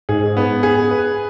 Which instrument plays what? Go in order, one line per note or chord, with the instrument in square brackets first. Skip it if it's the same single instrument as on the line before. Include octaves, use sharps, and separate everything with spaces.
[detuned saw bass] G#2 [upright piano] G#4
[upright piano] B3
G#4
B4